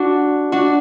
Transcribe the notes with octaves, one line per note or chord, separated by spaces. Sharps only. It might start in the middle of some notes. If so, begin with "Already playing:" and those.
Already playing: D4 F#4
D4 F#4